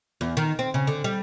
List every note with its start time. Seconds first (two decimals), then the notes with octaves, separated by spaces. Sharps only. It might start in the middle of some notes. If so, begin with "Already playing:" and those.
0.21 E2
0.37 D#3
0.59 C4
0.74 C#3
0.87 D3
1.04 G3